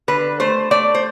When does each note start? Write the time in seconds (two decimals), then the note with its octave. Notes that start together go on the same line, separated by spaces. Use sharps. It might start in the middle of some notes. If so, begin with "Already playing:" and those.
0.08 D3 B4
0.40 A3 C5
0.71 A3 D5
0.95 C5